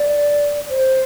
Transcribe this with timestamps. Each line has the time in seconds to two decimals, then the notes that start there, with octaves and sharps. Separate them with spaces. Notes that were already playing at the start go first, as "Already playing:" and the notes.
Already playing: D5
0.70 C5